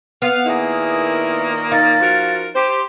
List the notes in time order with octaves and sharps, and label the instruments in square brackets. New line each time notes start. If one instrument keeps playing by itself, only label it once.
[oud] B3 [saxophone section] F5
[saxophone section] A#2 D#3 A#3 [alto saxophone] E4 [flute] G#4
[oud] D#4 [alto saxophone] F5 [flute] A6
[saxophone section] F3 F#4 A#4
[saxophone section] G4 [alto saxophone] C5 [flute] C6